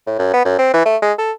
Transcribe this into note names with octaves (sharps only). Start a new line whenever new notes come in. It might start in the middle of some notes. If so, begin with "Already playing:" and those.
A2
F#2
B3
F#2
C4
E3
A3
G#3
A4